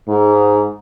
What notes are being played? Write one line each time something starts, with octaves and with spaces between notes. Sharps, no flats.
G#2